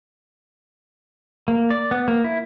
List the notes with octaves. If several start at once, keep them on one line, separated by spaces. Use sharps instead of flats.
A#3
D5
B3
A#3
E4